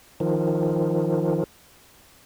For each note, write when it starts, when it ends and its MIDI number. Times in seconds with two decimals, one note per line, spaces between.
0.20 1.44 51
0.20 1.44 53